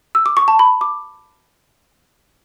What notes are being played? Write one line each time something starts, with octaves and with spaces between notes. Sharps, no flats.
E6
D6
C#6
A5
B5
D6